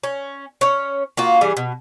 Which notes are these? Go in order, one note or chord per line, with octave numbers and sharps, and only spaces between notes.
C#4
C#4 C#5
A#3 F4 F#4
E3 G3 G#4
B2